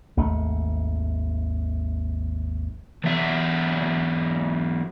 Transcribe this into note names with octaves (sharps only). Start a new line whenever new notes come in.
G#1 D#2 A3
E3 F#3 B3 E5